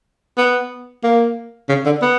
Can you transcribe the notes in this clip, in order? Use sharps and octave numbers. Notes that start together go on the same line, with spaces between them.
B3
A#3
C#3
D3
B3